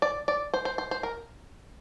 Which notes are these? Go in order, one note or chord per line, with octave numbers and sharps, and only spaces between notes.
D5
D5
C5
C5
C5
C5
A#4